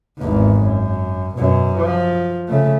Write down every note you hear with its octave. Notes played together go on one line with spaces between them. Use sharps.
G#1 E2
F#2
F#2 B2
F3
C#3 A3